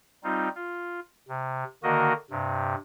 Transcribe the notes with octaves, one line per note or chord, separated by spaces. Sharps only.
G3 C4 D#4 F4
F4
C3
D3 D#3 A#3 F#4 A#4 D#5
G2 C3